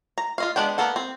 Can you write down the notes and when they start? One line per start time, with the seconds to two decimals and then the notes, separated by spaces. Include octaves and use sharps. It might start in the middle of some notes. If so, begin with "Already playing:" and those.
0.18 A#5
0.38 F4 D#5 F5
0.56 G#3 B3 D4 G4 G5
0.78 A#3 B3 A4 F#5
0.96 C4